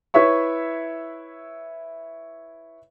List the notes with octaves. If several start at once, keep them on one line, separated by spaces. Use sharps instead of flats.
E4 B4 C#5 E5 C#6